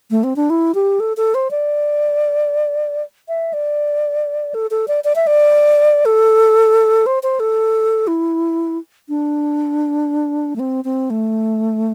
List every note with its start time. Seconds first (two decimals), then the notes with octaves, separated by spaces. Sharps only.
0.11 A3
0.24 C4
0.36 D4
0.50 E4
0.75 G4
1.00 A4
1.17 A4
1.35 C5
1.51 D5
3.28 E5
3.53 D5
4.54 A4
4.71 A4
4.88 D5
5.04 D5
5.16 E5
5.27 D5
6.05 A4
7.06 C5
7.23 C5
7.40 A4
8.07 E4
9.09 D4
10.56 A3
10.59 C4
10.85 C4
11.10 A3